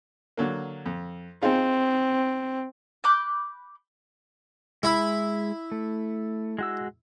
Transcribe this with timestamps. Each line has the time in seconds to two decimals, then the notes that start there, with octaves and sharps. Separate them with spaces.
0.37 D3 F#3 A#3
0.86 F2
1.43 C4 D#4 F4 G#4
3.04 B5 D6 F#6 G6
4.83 G#3 E4 B5 E6
5.72 A3
6.59 G#3 F#4 E6